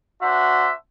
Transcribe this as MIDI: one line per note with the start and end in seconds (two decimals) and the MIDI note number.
0.22 0.71 62
0.22 0.71 66
0.22 0.71 72
0.22 0.71 76
0.22 0.71 78